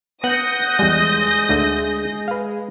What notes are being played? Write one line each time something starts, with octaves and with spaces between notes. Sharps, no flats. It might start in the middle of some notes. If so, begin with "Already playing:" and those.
B3 F#5 D#6 G6 A#6
E2 G3 G#3
D2 D3 A3
B4 F5